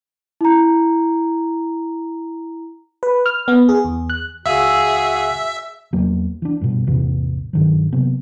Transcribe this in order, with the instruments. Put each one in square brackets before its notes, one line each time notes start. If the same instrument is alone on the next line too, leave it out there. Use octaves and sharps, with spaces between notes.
[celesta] E4 A#5
[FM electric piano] B4
F6
B3
G#4
E2
F#6
[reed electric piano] C#2 F5 E6 [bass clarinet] F#4 [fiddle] G#4 [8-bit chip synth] E5
[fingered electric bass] E2 F#3 A#3
E3 D4
G2 B2
A1 E2 C3 E3
G2 D#3 F#3
C3 F#3 A#3 B3